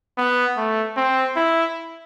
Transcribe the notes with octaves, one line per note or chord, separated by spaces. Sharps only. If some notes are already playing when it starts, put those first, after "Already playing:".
B3
A3
C4
E4